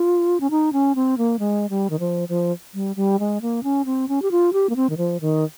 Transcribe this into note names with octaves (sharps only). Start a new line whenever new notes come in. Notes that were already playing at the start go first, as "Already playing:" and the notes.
Already playing: F4
C#4
D#4
C#4
C4
A#3
G#3
G3
D#3
F3
F3
G3
G3
G#3
A#3
C#4
C4
C#4
G4
F4
G4
A#3
C4
D#3
F3
D#3